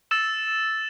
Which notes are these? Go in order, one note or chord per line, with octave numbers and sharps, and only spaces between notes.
E6 A6 E7